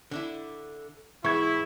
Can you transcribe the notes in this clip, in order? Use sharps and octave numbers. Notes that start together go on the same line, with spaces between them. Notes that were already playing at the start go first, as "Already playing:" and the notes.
D3 D4 E4
G#2 E3 B3 E4 C#6 G#6